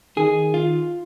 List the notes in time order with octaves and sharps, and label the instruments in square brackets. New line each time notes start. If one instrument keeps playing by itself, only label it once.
[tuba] D#3 [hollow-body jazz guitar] G#4
[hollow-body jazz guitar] F4